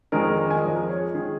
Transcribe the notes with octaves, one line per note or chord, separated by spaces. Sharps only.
F2 D#3 G#3 A#4
A#4
A#4
D#5 G#5
F2 F3 G#3 A#4
A#4
G#4 C#5
D#3 G#4